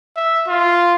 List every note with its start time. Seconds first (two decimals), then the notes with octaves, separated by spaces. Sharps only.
0.17 E5
0.48 F4